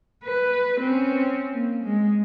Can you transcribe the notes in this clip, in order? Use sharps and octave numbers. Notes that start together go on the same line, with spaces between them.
B4
C4 C#4
A#3
G#3